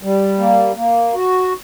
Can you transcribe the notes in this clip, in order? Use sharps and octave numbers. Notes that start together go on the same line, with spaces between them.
G3
A#3
A#3
F#4